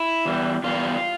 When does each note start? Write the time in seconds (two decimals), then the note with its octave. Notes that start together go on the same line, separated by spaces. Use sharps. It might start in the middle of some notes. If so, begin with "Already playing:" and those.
Already playing: E4
0.25 E2 E3 G3
0.64 E2 E3 G3 F4